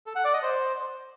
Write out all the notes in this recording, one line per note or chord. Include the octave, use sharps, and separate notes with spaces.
A4
F#5
D5
D#5
C5